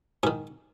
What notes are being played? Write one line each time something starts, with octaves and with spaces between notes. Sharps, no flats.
G#2 D#3 G#4